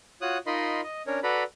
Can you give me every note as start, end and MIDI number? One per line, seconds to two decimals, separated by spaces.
0.22 0.38 65
0.22 0.38 66
0.22 0.38 73
0.22 0.38 87
0.22 0.38 90
0.47 0.81 63
0.47 0.81 65
0.47 0.81 70
0.47 0.81 75
0.47 0.81 83
0.47 0.81 84
0.83 1.02 75
1.07 1.19 61
1.07 1.19 62
1.07 1.19 70
1.07 1.19 73
1.23 1.43 66
1.23 1.43 69
1.23 1.43 71
1.23 1.43 74
1.23 1.43 82
1.23 1.43 83